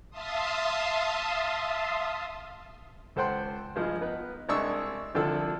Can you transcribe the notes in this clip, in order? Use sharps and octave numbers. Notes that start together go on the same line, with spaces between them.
E5 F5 A5 C6 D#6
C#2 A4 C5 F#5 G5 C6
G2 F3 G#3
B3 D#4 B4
C2 G#3 D4 C#6 D#6 E6
C2 D3 F3 D4 A4 E6